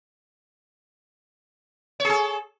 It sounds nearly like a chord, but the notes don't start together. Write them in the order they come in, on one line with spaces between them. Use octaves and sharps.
C#5 G#4 A4